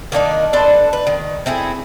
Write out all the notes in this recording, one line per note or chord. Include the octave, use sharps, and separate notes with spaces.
D#3 A#3 D4 D#4
D4 A4 B4 C5
B4
D#3
C4 E4 G#4 A4